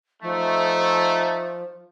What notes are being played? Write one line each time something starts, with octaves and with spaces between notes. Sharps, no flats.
F3 A3 D#4